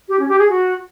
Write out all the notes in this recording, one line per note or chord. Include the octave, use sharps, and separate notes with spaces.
G4
C#4
G4
G#4
F#4